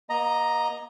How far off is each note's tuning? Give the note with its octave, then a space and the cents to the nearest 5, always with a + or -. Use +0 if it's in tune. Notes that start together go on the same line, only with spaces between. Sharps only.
A#3 +40 D#5 +0 A#5 +5